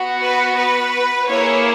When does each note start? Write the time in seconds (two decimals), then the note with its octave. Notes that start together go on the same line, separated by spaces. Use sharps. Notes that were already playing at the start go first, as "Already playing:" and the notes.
Already playing: B3 F#4
0.20 B4
0.55 B4
1.26 A#3 E4 G#4 C#5